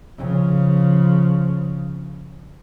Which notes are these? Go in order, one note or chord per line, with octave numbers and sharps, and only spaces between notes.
C#3 F3